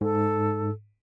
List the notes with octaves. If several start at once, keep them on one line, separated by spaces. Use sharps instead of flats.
G#2 A4